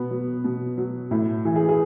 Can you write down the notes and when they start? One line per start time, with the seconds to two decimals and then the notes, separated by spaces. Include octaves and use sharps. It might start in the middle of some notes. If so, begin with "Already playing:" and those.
Already playing: B2 B3
0.11 F#3
0.44 B2
0.78 F#3
1.11 A2 E4
1.45 E3
1.56 G#4
1.69 G#4